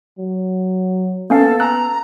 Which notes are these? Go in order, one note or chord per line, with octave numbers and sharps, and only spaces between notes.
F#3
A#3 B3 C#4 A4 F5
A5 A#5 E6 F#6